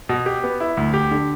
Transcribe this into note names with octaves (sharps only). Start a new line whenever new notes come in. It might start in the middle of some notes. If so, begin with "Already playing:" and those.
B2
G4
B3
E4
D2
G4
D3